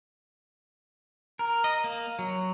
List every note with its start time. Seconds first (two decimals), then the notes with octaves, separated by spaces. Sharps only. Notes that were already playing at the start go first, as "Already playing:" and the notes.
1.39 A#4
1.64 D#5
1.84 A#3
2.19 F#3